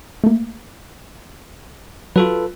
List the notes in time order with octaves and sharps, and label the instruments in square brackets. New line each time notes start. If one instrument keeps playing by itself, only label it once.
[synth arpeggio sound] A3 A#3
[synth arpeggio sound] F#3 F#4 [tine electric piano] F4 A4 B4